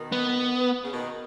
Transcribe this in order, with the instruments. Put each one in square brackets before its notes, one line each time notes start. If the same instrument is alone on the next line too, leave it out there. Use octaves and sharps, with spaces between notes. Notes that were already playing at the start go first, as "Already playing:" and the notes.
Already playing: [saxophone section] B2 D#3
[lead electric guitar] B3
[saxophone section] C#3
B2 D#3